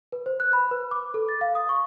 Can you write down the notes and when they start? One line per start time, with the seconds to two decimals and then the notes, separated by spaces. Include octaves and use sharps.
0.12 B4
0.26 C5
0.40 F#6
0.53 B5
0.71 B4
0.91 D6
1.14 A4
1.29 A6
1.41 F5
1.55 D#6
1.69 C#6